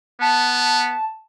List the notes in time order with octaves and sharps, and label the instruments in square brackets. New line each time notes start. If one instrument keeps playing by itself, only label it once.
[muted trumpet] B3 [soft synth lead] A5